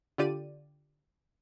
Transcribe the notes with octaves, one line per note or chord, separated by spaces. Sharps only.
D3 F4 G4 D5 D#7